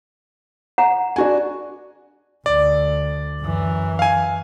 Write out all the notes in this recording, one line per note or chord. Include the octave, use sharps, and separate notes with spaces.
F#5 A#5
D4 F#4 G#5
D2 D5
F#2 E3
F5 G#5